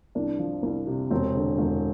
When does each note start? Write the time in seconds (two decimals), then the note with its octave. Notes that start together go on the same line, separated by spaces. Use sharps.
0.15 C2 D4
0.39 F3
0.63 C2
0.87 C3
1.11 E1 C4
1.35 D3
1.58 E1